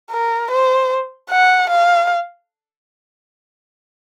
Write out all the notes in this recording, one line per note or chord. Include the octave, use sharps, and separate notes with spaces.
A#4
C5
F#5
F5